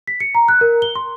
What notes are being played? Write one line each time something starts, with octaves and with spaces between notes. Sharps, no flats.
B6
C#7
A#5
F#6
A#4
G7
C6